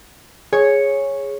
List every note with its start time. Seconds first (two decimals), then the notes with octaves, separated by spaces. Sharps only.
0.53 G#4 C#5